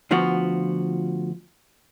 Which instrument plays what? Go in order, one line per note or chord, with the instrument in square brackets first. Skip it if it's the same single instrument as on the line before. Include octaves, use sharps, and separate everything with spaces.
[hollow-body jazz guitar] D2 D3 F3 B3 F4 F#4